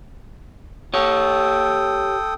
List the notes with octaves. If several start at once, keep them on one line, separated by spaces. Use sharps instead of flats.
G4 A4 C#5 G5 D#6